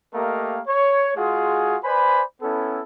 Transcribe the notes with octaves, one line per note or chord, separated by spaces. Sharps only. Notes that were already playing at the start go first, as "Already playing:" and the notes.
A3 A#3 G4 A#4 D#5 F5
C#5
G#3 F4 F#4 G#4
B4 C5 D5 G#5 B5
B3 C#4 E4 A4